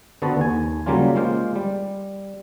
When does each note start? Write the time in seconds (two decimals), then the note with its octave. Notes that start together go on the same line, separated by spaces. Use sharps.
0.22 D3 B3 C4 F#4 A5
0.37 D#2 G#5
0.86 C#3 F#3 G3 A#3 C#4 F4
1.15 G#3 A#3 F4 C5 F5
1.56 G3